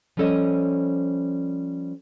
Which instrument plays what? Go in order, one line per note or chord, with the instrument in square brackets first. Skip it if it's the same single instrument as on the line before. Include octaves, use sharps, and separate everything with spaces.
[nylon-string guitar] F3 G3 C#4 A4 C#5 D#5